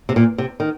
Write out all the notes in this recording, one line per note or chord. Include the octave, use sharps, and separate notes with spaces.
C3
A#2
C3
D#3